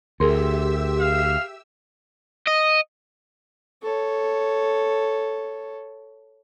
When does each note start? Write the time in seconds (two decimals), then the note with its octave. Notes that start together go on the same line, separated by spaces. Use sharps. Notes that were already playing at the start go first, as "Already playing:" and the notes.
0.20 D2 G4 G#4 A#4 E5 C6 E6
1.00 F5
2.47 D#5
3.83 A4 C#5